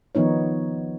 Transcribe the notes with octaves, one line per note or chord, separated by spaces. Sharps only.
D#3 F3 B3 D#4 C#5